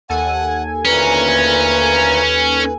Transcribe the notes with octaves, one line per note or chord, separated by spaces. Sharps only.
D#2 A4 F#5 G#5
D2 A#2 C#4 B4 A#5